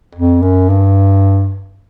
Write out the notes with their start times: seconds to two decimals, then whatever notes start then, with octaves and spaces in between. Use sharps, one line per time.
0.15 F2
0.42 F#2
0.69 G2